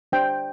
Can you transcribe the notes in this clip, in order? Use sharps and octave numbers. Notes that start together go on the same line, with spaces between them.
D4 G4 C5 G5